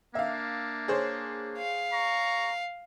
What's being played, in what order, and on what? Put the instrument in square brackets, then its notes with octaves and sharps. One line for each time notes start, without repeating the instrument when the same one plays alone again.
[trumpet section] A#3 D4 [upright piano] E5 F5
[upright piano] G#4 C5 C#5
[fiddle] F5
[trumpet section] A#5 C#6